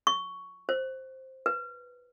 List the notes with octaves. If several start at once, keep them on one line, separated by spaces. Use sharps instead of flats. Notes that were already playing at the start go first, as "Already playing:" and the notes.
C#6
C5
B4